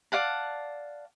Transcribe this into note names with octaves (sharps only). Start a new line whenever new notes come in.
D5 F5 F#5 A5